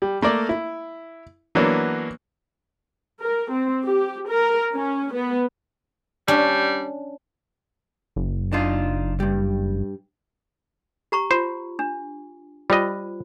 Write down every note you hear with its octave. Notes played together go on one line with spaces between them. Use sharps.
G3
A3 A#3 A#4 D5
E4
E3 F#3 A#3 B3 D4
A#4
C4
G4
A#4
C#4
B3
G3 C#4 D4
F#1
D4 D#4 F4
G2 G3
G4 A#5 C#6
F4 C5
D4
G3 F4 C5 D#5